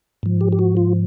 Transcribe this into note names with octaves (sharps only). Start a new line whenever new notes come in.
G#2 F3
G4
G4
F#4
F4